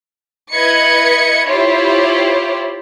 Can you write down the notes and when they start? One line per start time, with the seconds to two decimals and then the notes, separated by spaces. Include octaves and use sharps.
0.52 E4 B4 D#5 G#6 C#7
1.46 E4 F4 G4 C5 C#5